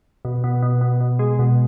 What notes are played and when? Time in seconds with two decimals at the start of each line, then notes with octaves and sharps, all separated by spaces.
0.25 B2
0.44 B2
0.63 B2
0.81 B2
1.01 B2
1.19 G#3
1.39 B2